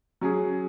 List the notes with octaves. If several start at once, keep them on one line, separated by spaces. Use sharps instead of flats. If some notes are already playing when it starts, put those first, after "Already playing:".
F#3 C#4 G#4